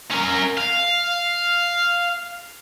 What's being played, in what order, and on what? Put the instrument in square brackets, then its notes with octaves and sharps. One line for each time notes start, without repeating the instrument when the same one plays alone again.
[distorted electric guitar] C#4 A#4
F5